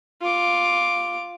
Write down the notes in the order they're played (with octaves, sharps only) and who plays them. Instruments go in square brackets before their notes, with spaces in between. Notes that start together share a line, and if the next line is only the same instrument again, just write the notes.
[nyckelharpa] F4 D6